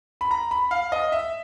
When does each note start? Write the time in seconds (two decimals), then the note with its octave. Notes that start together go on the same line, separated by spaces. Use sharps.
0.21 B5
0.31 A#5
0.51 B5
0.71 F5
0.92 D#5
1.12 E5